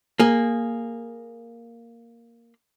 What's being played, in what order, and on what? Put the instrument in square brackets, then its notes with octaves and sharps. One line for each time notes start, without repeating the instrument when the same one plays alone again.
[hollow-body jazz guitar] A#3 G#4